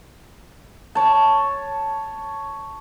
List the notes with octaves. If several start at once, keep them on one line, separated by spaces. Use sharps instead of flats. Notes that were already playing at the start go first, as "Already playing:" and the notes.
C#5 A5